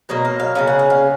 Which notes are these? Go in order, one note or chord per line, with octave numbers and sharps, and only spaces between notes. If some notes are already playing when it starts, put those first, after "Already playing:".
B2 F#3 A#3 D#5
F5
F5
C#3 G#3 C#4 F5
F#5
F5
F5